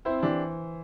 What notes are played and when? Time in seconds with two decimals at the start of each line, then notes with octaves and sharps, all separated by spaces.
0.05 C4 E4 C5
0.22 E3 D4 G4